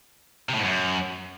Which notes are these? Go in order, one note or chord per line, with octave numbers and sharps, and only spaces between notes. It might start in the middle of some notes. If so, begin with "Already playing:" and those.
C3
A2
G#2
F#2